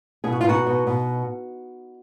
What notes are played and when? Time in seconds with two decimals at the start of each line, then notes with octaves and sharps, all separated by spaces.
0.24 B2 G#4
0.32 F#4
0.41 F4
0.44 B2 D#4 F#4
0.66 B2
0.87 B2